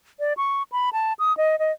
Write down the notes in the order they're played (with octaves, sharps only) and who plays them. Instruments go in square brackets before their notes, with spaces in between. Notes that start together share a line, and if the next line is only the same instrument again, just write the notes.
[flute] D5
C#6
B5
A5
D#6
D#5
D#5